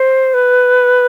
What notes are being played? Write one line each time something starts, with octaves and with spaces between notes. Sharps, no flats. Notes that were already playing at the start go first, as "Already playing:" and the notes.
Already playing: C5
B4